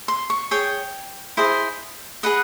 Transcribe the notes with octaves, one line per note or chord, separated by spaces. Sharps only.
C6
C#6
G#4 C#5 G5
E4 G#4 C5 D#5
G#4 B4 D#5 F#5